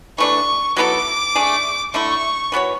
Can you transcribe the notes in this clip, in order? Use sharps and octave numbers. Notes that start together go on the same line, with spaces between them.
E3 A3 D4 C#6
F#3 B3 E4 A4 D6
A3 D4 G#4
D3 A3 E4 C#6
E3 B3 F#4 C#5